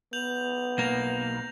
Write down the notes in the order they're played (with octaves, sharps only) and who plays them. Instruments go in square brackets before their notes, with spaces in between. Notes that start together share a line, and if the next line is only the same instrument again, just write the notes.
[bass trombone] B3 [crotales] G6 F7 F#7
[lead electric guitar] B1 A#3 [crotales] A#6 F7